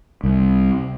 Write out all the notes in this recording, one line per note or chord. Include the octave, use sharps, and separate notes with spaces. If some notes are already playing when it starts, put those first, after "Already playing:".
C2